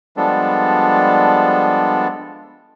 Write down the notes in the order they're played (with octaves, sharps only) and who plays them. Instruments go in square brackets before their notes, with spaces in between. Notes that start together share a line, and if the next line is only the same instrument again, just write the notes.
[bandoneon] F3 G3 G#3 B3 D4 A4